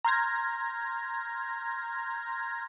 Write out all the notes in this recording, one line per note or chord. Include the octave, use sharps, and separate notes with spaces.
A#5 C6 F6 G6 G#6 A#6